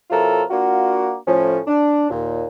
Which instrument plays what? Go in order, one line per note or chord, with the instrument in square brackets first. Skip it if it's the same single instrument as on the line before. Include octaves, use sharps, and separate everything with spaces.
[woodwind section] C3 F#3 E4 F4 A4 A#4
A#3 D4 F4 F#4
A2 F3 C#4
D4
D#2 A#2